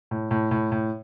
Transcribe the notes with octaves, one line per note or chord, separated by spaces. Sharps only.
A2
A2
A2
A2